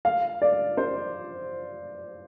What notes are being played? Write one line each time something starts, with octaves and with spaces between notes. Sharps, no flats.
F5
D5
C5